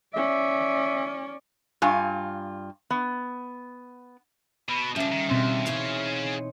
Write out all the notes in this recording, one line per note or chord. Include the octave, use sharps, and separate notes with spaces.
C#4 D5 E5
G2 F4 G#5
B3
B2 B5
C#3 F3 G3 D4 E5
D#3
D#2 B2 C4 C6
E3 D#4 G#4 C#5 F5